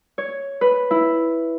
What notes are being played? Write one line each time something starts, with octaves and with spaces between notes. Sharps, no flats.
C#5
B4
E4